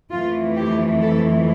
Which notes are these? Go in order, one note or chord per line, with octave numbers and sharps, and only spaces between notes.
F2 E3 A3 F4
G4
A4